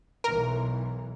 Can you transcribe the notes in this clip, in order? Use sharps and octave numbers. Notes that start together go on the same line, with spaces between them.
B1 E3 A#4